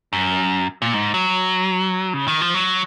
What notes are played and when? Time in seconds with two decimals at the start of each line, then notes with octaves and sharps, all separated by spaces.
0.13 F#2
0.82 A#2
0.94 G#2
1.14 F#3
2.14 C#3
2.28 D#3
2.41 F3
2.55 F#3